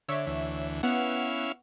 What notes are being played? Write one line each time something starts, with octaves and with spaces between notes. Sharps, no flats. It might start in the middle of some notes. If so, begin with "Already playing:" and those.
D3 C#5 E5
D2 E3
B3 C#4 E4 F5 F#5